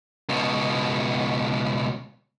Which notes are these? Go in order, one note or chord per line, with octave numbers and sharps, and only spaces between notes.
C#2 B2